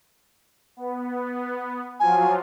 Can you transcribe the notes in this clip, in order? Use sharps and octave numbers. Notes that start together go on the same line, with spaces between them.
B3
F3 F#3 F4 G#5